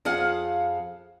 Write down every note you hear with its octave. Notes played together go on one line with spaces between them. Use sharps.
F2 G#4 F5 F#5